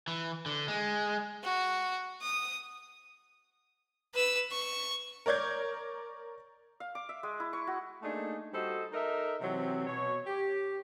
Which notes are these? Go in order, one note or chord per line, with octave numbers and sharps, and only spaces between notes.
E3
D3
G#3
F#4
D#6
B4 E6
C#6
A#4 C#5 D5 G6 G#6
F5
D6
E5
G#3
E4
C#6
F#4
A3 A#3 D4 D#4 G#4
G3 F#4 A4 C5 D#5
D#4 A4 A#4 D#5 E5
C3 E3 F#3 C4
B2 C#5
G4